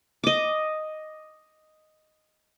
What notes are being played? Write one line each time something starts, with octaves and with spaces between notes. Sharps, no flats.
D#5 D6